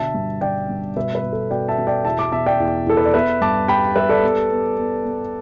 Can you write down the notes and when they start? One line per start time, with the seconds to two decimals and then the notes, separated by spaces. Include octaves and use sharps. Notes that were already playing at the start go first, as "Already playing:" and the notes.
Already playing: B2 D3 E5 A5
0.14 G2
0.41 D3 D5 G5
0.69 G2
0.96 B2 B4 E5
1.15 B4
1.23 B2
1.33 A4
1.50 B2 D5 G5
1.69 E5 A5
1.78 B2
1.87 D5 G5
2.05 E2 E5 A5
2.19 A5 D6
2.32 B2 E5 A5
2.46 D5 G5
2.60 E2
2.87 E2 A4
2.97 B4
3.05 D5
3.14 B3 B4 E5
3.41 G2 A5 D6
3.68 G3 G5 B5
3.96 G3 B4 E5
4.09 A4 D5
4.23 B3
4.50 B3
4.77 B3
5.05 B3